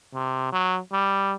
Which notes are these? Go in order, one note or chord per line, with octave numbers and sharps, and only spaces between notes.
C3
F#3
G3